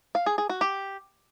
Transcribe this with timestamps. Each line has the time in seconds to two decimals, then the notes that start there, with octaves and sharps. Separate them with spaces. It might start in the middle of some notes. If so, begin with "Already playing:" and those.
0.15 F5
0.26 G#4
0.38 G#4
0.49 F#4
0.61 G4